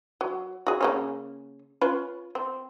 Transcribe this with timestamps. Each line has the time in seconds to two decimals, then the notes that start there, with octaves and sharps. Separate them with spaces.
0.21 F#3
0.67 F#4 G#4
0.81 C#3 A#3 C#4
1.81 C#4 F4 B4
2.35 C4